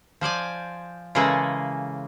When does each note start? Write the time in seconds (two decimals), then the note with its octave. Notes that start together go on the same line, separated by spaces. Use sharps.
0.21 F3 C5 D5 G#5
1.15 C#3 E3 G#3 A#3 G#4 A4